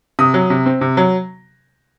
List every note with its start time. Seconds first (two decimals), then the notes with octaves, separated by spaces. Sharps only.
0.19 C3 D#6
0.34 F#3
0.50 C3
0.66 C4
0.81 C3
0.97 F#3